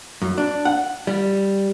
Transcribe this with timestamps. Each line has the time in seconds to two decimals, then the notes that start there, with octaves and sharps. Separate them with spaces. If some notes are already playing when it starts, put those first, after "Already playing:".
0.22 F#2
0.38 D4
0.65 F#5
1.07 G3